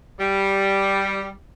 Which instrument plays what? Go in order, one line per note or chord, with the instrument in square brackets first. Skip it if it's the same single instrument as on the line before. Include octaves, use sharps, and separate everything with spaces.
[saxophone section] G3